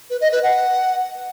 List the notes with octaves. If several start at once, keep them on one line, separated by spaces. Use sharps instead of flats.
B4
D#5
B4
F#5